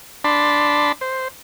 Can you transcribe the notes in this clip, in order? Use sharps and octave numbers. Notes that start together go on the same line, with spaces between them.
D4 A5 B5 C6
C5